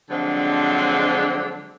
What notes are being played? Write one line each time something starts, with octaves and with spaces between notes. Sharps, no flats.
D3 F3 F#3 G#3 C4 D4